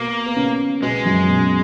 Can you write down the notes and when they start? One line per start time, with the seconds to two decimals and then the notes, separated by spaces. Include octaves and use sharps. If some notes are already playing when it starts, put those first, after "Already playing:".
Already playing: B2 A#3 B3
0.26 B3
0.36 C#3 C#4
0.82 B2 G#3 B3
1.05 F#2 F#3
1.28 B2
1.38 C#3